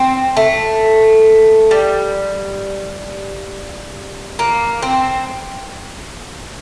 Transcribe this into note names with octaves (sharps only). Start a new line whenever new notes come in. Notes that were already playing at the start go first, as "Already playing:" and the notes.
Already playing: C4
A3
G3
A#3
C4